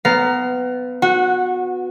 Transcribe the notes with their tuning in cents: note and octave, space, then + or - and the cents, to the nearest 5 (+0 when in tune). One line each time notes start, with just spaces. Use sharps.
B3 +20 F5 +0 A#5 +0
F#4 -25 F#5 +0